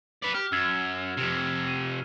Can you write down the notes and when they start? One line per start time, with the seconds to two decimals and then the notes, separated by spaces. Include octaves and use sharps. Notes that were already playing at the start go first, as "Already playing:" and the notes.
0.22 B4 D5
0.34 G4 F6
0.52 F#2 E6 G#6 E7
1.17 F2 C3
1.68 D#7